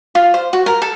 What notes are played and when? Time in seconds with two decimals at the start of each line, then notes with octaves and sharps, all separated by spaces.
0.15 F4
0.34 C5
0.53 F#4
0.66 A#4
0.82 A4